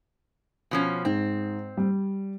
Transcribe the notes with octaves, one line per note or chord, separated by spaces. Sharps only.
B2 F3 C#4
G#2 C4
G3